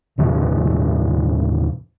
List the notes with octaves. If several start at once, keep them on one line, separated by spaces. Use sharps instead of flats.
D#2 A2 C3 E3